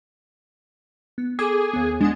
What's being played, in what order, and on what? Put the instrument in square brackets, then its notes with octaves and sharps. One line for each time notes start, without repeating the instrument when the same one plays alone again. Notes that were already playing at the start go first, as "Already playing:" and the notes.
[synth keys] B3
[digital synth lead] G#4 [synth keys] A4 D6
[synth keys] D#2 B3
[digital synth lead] G#3 [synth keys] D4 F#5